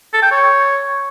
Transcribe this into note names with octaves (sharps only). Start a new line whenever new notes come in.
A4
G5
C#5